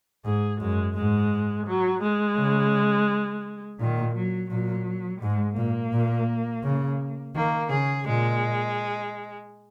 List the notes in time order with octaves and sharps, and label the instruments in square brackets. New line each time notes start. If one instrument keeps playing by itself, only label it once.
[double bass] G#2 [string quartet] G#4
[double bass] F#2 [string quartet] G#3
[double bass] G#2 [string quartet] G#3
[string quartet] F#3
G#3
[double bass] C#3
[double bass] A#2 [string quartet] D#3
[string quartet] F#3
[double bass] A#2 [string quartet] F#3
[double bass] G#2 [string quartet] G#3
[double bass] A#2 [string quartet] A#3
[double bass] A#2
C#3
[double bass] D#3 [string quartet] A#3
[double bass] C#3 [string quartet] G#4
[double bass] A#2 [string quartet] G#3